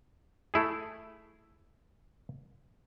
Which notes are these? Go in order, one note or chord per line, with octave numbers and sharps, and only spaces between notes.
A3 E4 G#4